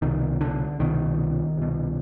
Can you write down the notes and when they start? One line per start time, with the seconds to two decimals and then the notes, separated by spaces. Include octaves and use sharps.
0.02 C2 B2 D#3
0.41 D3
0.79 C2 B2 D#3
1.58 C2 B2